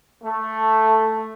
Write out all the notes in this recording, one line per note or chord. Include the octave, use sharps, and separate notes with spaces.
A3